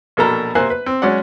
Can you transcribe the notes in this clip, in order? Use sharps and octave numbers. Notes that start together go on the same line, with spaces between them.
A#1 B2 A#3 A4 A#4 A#5
C3 A#3 C5 G#5 F#6
B4
C4
F#3 G#3 C#4 D5 F#5